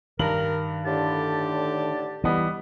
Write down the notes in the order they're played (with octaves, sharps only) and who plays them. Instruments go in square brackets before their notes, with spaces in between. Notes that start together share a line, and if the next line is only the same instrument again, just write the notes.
[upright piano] G2 A#5 F#7 [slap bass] D#3 [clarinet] A#4
[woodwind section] A2 D3 A5 [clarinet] G4
[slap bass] E3 [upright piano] G3 B3 D#5